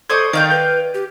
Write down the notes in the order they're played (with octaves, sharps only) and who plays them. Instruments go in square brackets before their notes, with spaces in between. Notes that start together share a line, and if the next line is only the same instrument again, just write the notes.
[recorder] A4 [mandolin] C5 D5 D#5 [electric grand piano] C#6 D#6 G#6
[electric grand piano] D#3 [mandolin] D5 F5 G5 [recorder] D#5
[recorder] B4 [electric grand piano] G6
[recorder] G4